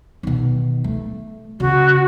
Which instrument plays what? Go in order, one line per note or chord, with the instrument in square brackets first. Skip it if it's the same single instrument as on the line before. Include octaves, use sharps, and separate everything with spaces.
[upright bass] B2 D#3
A3
[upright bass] C#3 [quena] F#4